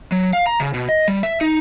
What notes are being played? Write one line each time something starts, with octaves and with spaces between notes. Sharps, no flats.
F#3
F5
A#5
C#3
B2
D#5
G3
E5
D#4